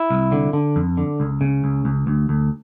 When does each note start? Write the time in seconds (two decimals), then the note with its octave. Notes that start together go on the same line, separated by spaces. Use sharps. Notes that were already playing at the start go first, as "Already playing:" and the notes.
Already playing: E4
0.10 C2
0.32 D3
0.53 D3
0.76 F2
0.97 D3
1.20 C#2
1.41 C#3
1.64 C#2
1.85 C#2
2.07 D2
2.29 D2